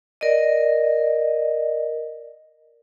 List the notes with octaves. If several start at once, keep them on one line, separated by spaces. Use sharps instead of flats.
A#4 D5 D#5